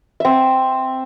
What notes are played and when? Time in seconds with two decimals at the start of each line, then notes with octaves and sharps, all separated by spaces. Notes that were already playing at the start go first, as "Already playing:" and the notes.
0.20 C4 E5